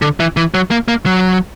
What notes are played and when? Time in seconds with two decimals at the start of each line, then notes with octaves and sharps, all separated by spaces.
0.02 D3
0.20 E3
0.37 E3
0.54 F#3
0.71 A#3
0.88 A#3
1.06 F#3